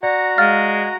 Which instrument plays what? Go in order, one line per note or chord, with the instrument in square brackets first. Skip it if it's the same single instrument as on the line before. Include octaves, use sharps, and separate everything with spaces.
[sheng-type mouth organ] F#4 A#5 [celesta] D5 [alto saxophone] F#5
[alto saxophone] G#3 [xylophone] F5 F6 A6